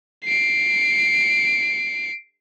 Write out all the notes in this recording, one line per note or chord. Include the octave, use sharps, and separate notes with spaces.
C7 D7